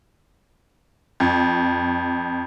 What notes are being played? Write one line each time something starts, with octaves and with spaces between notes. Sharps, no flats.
F2